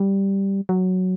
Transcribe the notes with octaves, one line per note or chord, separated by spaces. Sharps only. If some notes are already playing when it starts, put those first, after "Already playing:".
Already playing: G3
F#3